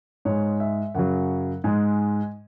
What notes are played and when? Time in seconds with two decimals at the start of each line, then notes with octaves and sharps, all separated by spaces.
0.25 G#2 G#3 C#5
0.60 E5
0.95 F#2 C#3 F#3 F#5
1.64 G#2 G#3 G#5